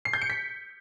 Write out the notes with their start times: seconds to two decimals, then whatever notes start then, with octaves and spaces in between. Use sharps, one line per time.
0.05 C7
0.13 G6
0.22 C#7
0.30 B6